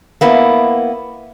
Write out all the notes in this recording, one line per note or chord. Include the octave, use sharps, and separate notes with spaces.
A#3 B3 E4